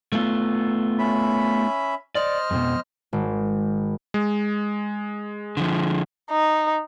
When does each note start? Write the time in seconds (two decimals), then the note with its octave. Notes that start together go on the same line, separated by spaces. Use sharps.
0.12 A3 B3 F4
0.99 C#4 E5 B5
2.15 C5 D5 D#5 F6
2.51 F2 B2
3.13 G#1
4.14 G#3
5.57 D3 F3
6.31 D#4